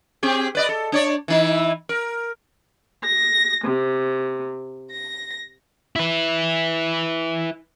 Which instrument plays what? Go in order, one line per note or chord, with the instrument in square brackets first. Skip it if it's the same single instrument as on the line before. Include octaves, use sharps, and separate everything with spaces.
[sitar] C4 G4 G#4
B4 D5 D#5
A4
D4 C#5 D5
E3 D#4 E4
A#4
[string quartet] A#6
C3
A#6
[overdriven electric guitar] E4 B4